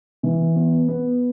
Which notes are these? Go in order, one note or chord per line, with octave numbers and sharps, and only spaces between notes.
E3
B3
B3